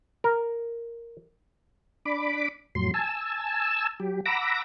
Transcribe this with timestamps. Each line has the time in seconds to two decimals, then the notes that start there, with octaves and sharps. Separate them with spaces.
0.24 A#4
2.05 D4 B5 D6
2.75 F2 A2 F#3 C6
2.94 G#5 A5 E6
4.00 F#3 G4
4.26 F#5 A#5 B5 D6 E6 A#6